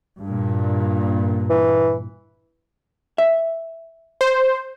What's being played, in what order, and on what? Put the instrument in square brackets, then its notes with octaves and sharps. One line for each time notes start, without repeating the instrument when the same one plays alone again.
[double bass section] G2 A#2
[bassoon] E3
[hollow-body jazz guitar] E5
[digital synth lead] C5